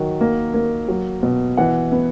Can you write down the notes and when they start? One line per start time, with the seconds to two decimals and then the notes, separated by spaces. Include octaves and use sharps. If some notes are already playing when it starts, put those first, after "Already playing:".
Already playing: D#3 F#3
0.21 A#3
0.54 A#3
0.88 F#3
1.23 B2
1.57 E3 F#5
1.91 B3